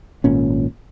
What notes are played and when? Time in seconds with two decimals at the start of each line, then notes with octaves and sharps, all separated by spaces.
0.24 G#1 A#2 C#4